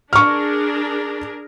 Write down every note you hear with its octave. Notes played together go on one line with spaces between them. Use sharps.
D4 G#4 A#4 C#6 F6